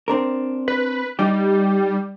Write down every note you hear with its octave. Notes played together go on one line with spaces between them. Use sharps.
C4 D4 A#4
B4
G3 D#4 G4